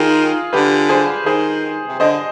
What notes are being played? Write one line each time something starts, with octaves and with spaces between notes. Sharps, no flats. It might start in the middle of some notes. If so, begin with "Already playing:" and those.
Already playing: D#3 F4 G#4
D3 G4 B4
G#4 C5
D#3 G#4 C5
C3
D3 C5 D#5